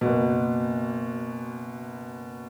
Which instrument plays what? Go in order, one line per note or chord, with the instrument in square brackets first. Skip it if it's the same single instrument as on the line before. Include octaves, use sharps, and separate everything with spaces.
[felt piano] F#1 B2